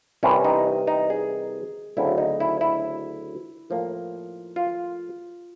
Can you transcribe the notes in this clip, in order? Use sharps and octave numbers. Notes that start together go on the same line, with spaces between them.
C2 C3 E3 C#4
D#4
D#4
G#4
D2 C#3 F#3 A3 C4 E4
D#4
E4
E4
A2 F3 A#3
F4